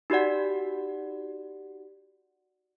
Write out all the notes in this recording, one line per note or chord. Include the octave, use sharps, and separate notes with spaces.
D#4 F#4 G4 D5 F#5